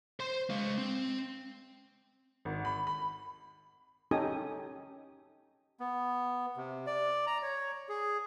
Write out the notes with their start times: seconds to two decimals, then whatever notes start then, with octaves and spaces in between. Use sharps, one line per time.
0.20 C5 C6
0.50 G#3 F5
0.78 C4
2.45 G#1
2.65 B5
2.87 B5
4.11 C#4 D#4 G4 A4 G#5 D#6
5.80 B3
6.57 C3
6.87 D5
7.27 A#5
7.43 C#5
7.89 G#4